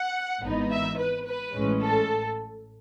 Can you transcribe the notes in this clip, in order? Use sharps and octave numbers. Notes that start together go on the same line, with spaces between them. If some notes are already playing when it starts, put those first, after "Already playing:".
Already playing: F#5
G#1 G#2 E3 B3 D#4
E5
B4
B4
A1 A2 G#3 C#4
A4